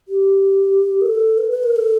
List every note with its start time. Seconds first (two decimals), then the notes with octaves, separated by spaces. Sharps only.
0.08 G4
1.01 A#4
1.06 A4
1.38 B4
1.51 B4
1.63 A#4
1.76 A4